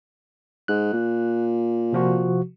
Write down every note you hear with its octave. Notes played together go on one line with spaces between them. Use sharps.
G#2 F#6
A#2
C3 F3 F#4